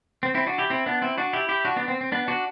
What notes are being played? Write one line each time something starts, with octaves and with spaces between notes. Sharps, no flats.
C4
C4 E4
D4 F#4
E4 G4
C4 E4
B3 D4
C4 E4
D4 F#4
E4 G4
E4 G4
D4 F#4
B3 D4
C4
C4
B3 D4
D4 F#4